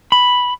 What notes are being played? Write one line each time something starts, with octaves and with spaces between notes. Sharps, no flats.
B5